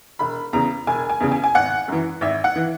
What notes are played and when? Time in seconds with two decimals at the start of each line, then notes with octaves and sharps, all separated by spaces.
0.19 E1 B5
0.53 E2 C#3 A#5
0.87 E1 G#5
1.09 G#5
1.20 E2 C#3
1.32 G#5
1.44 G#5
1.55 G#1 F#5
1.88 F#2 E3
2.21 G#1 E5
2.44 F#5
2.56 E3